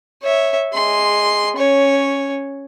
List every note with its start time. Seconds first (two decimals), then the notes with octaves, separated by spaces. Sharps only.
0.22 C#5 E5
0.73 G#3 C6
1.57 C#4 C#5